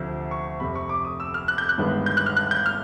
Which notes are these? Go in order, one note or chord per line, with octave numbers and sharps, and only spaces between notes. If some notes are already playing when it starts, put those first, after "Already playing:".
Already playing: D2 C3 F3 A3 C4
C#6
F1 F2 C3 B5
C#6
D6
D#6
E6
F6
F#6
G6
F#6
G1 G2 D#3 G#3 B3
G6
F#6
F6
F#6
G6
F6